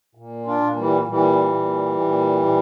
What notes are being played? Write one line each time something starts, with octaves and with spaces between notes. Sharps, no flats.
A#2
D4 F4
A#2
E3 G3
A#2 E3 G3
A#2
A#2
A#2